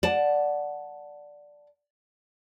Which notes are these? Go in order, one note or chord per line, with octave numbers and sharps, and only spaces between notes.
D5 F#5 A5